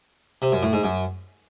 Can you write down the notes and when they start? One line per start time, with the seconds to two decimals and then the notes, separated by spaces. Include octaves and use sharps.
0.42 C3
0.52 F#2
0.63 A2
0.73 G#2
0.83 F#2